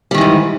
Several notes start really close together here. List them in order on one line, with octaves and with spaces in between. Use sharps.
G3 D#3 E3 G#2